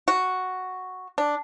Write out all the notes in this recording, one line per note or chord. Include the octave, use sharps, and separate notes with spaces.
F#4
D4